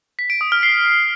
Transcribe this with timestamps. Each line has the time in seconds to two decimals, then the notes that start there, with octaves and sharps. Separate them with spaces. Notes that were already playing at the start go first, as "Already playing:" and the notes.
0.19 B6
0.30 D7
0.41 D#6
0.52 F6
0.63 C7